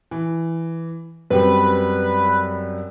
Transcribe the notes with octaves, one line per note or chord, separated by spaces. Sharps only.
E3
F#2 G3 C4 B4